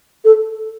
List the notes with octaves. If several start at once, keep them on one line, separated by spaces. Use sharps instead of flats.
A4